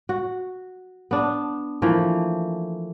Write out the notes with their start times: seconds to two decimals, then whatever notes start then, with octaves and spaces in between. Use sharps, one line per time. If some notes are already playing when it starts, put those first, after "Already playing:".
0.09 F#4
1.11 B3 D4
1.82 E3 F3 A3 A#3